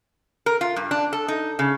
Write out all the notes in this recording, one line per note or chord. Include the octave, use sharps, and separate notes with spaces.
A#4
F4
G2
D4
A4
D#4
C#3